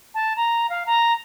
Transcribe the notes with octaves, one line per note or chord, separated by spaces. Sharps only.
A5
A#5
F5
A#5